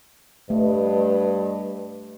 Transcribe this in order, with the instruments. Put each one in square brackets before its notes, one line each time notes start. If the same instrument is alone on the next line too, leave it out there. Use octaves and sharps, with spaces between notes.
[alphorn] G2 [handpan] A3 [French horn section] B4 D#5